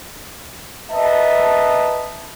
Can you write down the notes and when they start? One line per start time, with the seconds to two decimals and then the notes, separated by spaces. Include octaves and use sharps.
0.92 A#4 B4 D#5 E5 A5